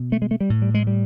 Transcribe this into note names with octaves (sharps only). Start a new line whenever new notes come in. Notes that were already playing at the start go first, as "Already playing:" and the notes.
Already playing: B2
A3
G#3
A3
G3
A2
G3
G#3
G3